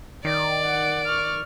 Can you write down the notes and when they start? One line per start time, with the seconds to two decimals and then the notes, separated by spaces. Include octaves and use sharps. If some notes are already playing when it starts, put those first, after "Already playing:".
0.25 D#3 D5
0.65 F#5
1.06 C#6 F6